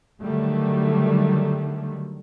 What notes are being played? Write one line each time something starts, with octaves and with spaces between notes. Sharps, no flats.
D3 D#3 F#3 G3 A3